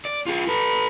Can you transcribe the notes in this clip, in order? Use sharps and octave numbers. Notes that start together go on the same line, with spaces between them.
D5
F4 G#4
A4 B4